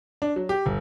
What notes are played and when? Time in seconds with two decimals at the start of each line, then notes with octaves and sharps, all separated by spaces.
0.22 D4
0.36 F#3
0.49 G4
0.66 G1